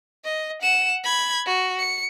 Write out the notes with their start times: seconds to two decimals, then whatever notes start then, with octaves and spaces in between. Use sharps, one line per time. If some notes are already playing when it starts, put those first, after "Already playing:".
0.25 D#5
0.62 F#5 E7
1.04 B5 G#6
1.46 F#4
1.79 C#7